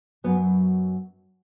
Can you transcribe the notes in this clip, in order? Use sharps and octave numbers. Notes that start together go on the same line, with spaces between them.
F#2 F#3 B3